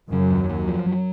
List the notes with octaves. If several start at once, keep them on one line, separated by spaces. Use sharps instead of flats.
F#2 C#3 F#3
D#2
D#2
F3
F#3